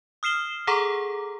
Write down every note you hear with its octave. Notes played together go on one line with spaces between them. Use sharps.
D#6 F6 C7 E7 G7
G#4 A4 F#5 A#5 D6